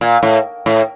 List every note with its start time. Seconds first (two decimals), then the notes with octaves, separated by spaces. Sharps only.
0.01 A#2
0.23 A2
0.66 A2